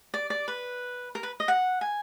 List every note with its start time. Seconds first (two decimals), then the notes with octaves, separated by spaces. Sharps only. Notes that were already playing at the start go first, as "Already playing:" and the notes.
0.14 D5
0.30 D5
0.48 B4
1.15 A#4
1.23 B4
1.40 D#5
1.48 F#5
1.81 G#5